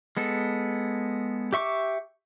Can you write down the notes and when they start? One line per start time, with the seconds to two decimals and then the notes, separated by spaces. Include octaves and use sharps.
0.17 G#3 B3 A4
1.53 G4 E5 C#6 D6